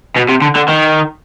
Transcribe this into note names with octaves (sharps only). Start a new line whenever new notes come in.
B2
C3
D3
D3
D#3